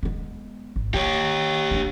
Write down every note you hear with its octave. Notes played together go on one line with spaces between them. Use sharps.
G#3 B3
G#1
D#3 G4 C#5
D4 E4